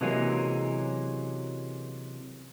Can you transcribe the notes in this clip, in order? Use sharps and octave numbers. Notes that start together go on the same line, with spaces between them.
C3 E3 F#3 G#3 A#3 C#4